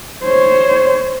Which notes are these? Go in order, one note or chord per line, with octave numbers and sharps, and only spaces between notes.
C5 C#5